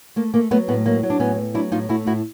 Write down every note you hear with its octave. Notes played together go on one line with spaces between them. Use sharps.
A3 A#3
A3 A#3
F#3 A3 B3
A2 A3 B3
F#3 A#3
F#3
D4
A2 B3 C#4
A3
F#3 D4 E4
A2 D#4 F4
A3 E4 F#4
A2 E4 F#4